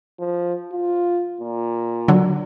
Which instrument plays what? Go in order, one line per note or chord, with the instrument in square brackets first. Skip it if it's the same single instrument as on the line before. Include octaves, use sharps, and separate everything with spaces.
[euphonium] F3
F4
A#2
[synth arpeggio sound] D3 F#3